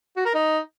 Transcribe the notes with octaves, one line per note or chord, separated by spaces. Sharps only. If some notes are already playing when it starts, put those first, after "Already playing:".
F#4
A#4
D#4